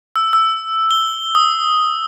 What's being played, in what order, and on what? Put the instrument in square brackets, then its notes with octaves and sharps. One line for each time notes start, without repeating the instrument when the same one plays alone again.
[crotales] E6
E6
G7
D#6